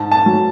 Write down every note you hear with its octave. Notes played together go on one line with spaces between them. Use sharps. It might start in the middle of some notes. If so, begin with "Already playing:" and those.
Already playing: G#2 A5
A5
F#3